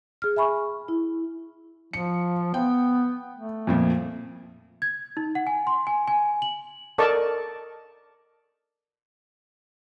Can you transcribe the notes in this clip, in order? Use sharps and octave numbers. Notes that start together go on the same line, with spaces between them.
G#4 F6
E5 G#5 B5 C#6
E4
F3 C#7
B3 G5
A3
F2 A#2 F3
G#6
D#4
F#5
G#5
C6
G#5
G#5
F#7
A4 A#4 D5 D#5 A5 C#6